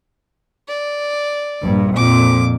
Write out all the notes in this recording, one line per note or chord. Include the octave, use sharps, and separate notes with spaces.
D5
A#1 G2
F2 A#2 D6